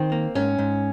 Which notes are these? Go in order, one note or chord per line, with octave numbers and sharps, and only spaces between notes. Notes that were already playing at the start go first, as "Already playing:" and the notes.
Already playing: D#3 C4
A#3
G#2 C#4
G#2